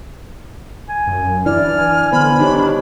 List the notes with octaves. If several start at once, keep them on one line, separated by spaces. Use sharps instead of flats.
G#5
F#2
E3 D4 E4 D5 F6
G#5
D3 B3 C5 B5
D4 D#4 G4 C#5